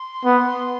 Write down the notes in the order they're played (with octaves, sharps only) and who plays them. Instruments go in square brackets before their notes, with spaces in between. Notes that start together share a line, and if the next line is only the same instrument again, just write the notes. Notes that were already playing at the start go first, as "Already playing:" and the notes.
Already playing: [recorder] C6
[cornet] B3